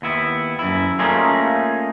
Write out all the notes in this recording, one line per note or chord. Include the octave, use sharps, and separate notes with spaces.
D#2 B3 E4
F#2 E4
A3 A#3 C#4 D#4 F4 G#4